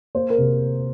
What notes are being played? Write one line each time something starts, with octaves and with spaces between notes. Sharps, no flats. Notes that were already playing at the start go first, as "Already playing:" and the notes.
A#3 C5
A#4
C3